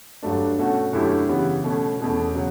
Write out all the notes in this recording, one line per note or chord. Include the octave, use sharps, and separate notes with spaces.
G2 F#3 A3 D4
B2 A3 C#4 F#4
F#2 D3 A3 E4 G4
C#3 E3 G3 B3
B2 A3 C#4
E2 B2 A3 C#4
C#3 F#3